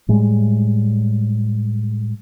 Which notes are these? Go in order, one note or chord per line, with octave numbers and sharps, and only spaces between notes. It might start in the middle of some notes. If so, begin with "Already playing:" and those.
A2 G3 G#3